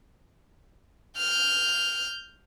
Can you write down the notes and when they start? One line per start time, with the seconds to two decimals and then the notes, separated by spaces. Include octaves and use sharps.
1.18 F6 G6